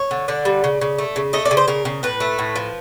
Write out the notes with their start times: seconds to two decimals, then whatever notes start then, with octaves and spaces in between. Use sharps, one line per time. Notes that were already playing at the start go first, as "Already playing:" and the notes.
Already playing: C#5
0.11 D3
0.28 D3 D5
0.45 G3
0.64 C#3
0.81 C#3
0.98 A3
1.16 C#3
1.33 A3 D#5
1.45 D5
1.51 C#3
1.57 C5
1.68 C#3 A#4
1.85 C#3
2.03 A2 B4
2.20 A3
2.38 A2
2.56 F3